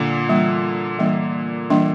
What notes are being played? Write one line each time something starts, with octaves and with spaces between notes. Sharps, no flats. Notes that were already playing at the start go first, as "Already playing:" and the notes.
Already playing: A#2 D3 G3
E3 G3 A#3 D4
E3 G3 A#3 D4
E3 G3 A#3 D4